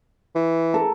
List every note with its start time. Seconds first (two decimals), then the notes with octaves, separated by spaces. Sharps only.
0.35 E3
0.74 A4 A#4